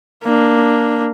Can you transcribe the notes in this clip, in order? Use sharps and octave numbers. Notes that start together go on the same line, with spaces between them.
A#3 D4